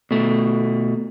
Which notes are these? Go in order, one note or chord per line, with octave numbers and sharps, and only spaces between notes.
B2 A3